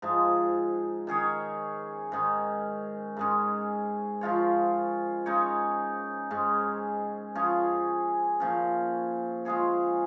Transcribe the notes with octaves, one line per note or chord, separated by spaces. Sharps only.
G#2 F3 G#3
D#3 C#4 G#4 C#5
G#2 D#3 C#4
G#2 G#3 C#4
F3 G#3 F4 C#5
C#3 G#3 D#4 C#5
G#2 G#3 C#4
F3 C#4 G#4 C#5
A#2 F3 C#4
G#3 F4 G#4 C#5